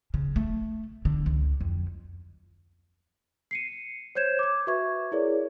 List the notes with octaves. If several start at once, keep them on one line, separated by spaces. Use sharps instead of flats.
C#3
A3
D3
C#2
F2
C7 C#7 D#7
C5 C#5 G6 G#6 E7
D6 G#6
F#4 B4 E5 C#6 G#6
E4 G#4 A#4 C#5 D5